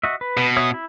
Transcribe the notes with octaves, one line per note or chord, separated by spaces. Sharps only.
F#4 D#5 E5
B4
B2
C#5 E5 D#6
E4